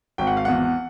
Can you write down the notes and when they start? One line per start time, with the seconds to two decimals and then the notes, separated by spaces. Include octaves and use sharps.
0.18 G#1 G5
0.27 F#5
0.37 F5
0.45 E2 F#5